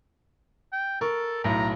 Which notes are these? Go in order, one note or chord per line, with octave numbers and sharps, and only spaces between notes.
G5
A4 A#4 C#6
B1 A2 A#5